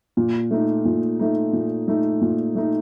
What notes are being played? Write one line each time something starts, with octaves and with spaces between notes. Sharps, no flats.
A#2
A3 D#4
A#2
A3 D#4
A#2
A3 D#4
A#2
A3 D#4